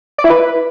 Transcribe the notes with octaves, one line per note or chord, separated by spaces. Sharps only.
D5
E4
B4